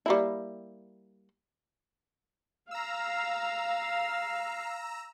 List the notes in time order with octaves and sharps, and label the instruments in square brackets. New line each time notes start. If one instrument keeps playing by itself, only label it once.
[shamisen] G3 A#3 E4
[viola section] F5 [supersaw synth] A#5 E6